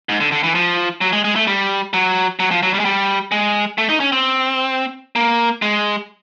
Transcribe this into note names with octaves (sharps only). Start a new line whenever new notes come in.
G#2
D3
D3
E3
F3
F#3
G#3
G#3
A3
G3
F#3
F#3
F3
F#3
G3
G#3
G3
G#3
A3
D#4
C#4
C4
A#3
G#3